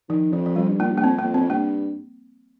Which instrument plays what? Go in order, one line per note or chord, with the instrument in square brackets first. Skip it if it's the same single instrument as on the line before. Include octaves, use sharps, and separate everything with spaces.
[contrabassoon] D#3 [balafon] F3
[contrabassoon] F2 [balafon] F3
[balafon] F3
[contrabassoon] F2 [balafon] G3
[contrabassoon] G2
[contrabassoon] A#2 [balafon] A#3
[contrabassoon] G2
[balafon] A#3
[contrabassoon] F2 [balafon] C4
[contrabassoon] F2 [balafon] A#3
[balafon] C4
[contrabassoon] F2
[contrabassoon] G2 [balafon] A#3